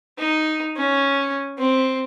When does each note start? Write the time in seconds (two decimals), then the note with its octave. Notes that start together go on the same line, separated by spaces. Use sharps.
0.19 D#4
0.76 C#4
1.58 C4